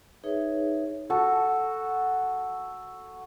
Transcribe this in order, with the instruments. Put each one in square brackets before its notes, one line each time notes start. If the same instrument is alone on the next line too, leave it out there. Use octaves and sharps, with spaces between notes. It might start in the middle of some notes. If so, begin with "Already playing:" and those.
[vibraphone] D#4 G#4 B4 C#5 E5
[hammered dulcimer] F#4 A4